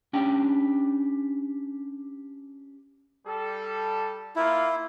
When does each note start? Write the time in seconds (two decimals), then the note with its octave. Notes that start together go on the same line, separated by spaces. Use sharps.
0.13 C#4 D4 G4 G5
3.27 G3 A4
4.36 A#3 E4 F4